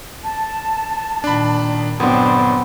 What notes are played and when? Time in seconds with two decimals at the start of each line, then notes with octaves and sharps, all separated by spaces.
0.23 A5
1.24 A#2 D#3 D4 B5
2.00 G1 A#2 F#3 B3 C4 D4 G5 C6